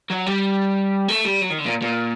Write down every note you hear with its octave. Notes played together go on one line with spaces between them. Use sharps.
F#3
G3
A3
G3
F#3
D#3
D3
A#2
A#2